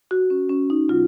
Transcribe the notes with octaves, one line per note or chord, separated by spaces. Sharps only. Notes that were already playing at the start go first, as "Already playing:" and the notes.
F#4
C#4
C#4
D#4
B2 F#3 F4